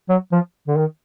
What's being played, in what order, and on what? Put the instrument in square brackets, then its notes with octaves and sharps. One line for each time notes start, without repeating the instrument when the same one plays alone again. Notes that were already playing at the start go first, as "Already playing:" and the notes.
[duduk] F#3
F3
D3
D#3